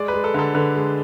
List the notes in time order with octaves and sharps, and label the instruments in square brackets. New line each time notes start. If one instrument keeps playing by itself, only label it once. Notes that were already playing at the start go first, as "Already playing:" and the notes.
Already playing: [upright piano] G#3 D5
B4
G#3
A4
D3 A4
D3 B4
G#3